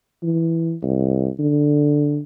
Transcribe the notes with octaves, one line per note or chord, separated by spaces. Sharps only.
E3
C2
D3